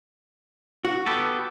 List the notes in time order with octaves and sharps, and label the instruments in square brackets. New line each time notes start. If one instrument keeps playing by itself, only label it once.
[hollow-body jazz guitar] F#4
[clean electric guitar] B3 G4 A4